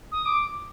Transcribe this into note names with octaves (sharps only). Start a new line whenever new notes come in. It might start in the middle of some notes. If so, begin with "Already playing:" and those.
D#6
D6